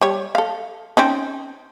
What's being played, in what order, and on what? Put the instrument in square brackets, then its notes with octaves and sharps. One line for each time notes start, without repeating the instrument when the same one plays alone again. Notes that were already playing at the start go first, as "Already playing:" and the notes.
[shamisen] G3 C#5
A4 F5
C4 C#4 D#4